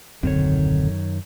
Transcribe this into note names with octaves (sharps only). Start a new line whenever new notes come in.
D#1 B1 F#2 D3 D#3 C4 C#5